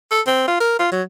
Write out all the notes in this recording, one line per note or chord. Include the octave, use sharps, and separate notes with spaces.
A4
C4
F4
A#4
F4
F#3